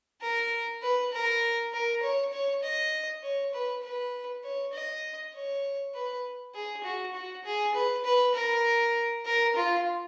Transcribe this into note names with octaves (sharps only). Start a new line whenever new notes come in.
A#4
B4
A#4
A#4
C#5
C#5
D#5
C#5
B4
B4
C#5
D#5
C#5
B4
G#4
F#4
F#4
G#4
B4
B4
A#4
A#4
F4